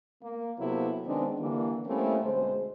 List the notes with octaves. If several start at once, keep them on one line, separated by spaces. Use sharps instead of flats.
A#3
C3 F#3 A#3 B3 E4 A4
D#3 G#3 B3 C4 D4
D3 E3 G3 A#3
G3 A3 A#3 C4 C#4 E4
D2 B2 G#3 C5